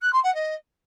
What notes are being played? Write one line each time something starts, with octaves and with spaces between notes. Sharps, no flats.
F#6
C6
F#5
D#5